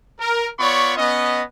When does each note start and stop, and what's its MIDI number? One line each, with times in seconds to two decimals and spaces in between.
0.20 0.47 70
0.59 0.97 59
0.59 0.97 65
0.59 0.97 73
0.59 0.97 74
0.59 0.97 83
0.59 0.97 85
0.97 1.42 59
0.97 1.42 61
0.97 1.42 75